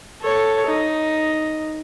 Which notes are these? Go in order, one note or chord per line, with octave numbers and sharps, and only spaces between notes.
A4 C#5
D#4